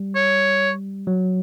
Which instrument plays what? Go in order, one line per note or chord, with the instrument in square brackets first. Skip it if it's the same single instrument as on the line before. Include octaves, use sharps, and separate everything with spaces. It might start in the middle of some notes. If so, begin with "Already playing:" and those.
Already playing: [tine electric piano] G3
[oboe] C#5
[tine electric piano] F#3